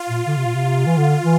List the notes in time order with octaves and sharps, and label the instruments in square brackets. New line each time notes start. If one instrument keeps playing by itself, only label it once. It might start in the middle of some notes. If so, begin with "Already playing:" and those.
Already playing: [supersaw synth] F4
[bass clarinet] A#2
D3
C3
A#2
C3
E3
D3
E3